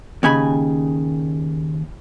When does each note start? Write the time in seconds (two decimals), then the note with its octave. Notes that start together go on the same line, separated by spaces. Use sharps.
0.23 D#2 C#3 G#5 B5